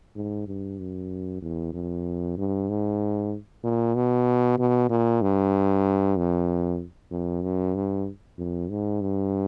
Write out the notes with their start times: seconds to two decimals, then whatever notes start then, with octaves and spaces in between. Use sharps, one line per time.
0.15 G#2
0.47 G2
0.79 F#2
1.42 E2
1.73 F2
2.37 G2
2.69 G#2
3.63 A#2
3.95 B2
4.58 B2
4.90 A#2
5.21 G2
6.17 F2
7.11 F2
7.43 F#2
7.75 G2
8.38 F2
8.70 G#2
9.01 G2